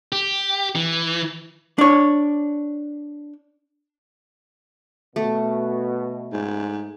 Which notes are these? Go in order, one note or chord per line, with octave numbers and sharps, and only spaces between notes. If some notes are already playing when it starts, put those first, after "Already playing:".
G4
E3
D4 C#5
B2 A3
G#2